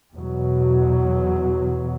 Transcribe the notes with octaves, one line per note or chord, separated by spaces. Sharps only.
E2 B2 F#3